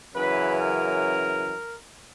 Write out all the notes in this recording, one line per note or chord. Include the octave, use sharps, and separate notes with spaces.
F#2 C#3 E3 B4
A#4